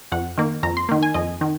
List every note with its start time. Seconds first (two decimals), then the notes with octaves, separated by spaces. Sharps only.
0.12 F2 F#5
0.38 D#3 A#3
0.63 F2 A#5
0.77 C6
0.89 D#3 A#3
1.03 G#5
1.14 F2 D#5
1.41 D#3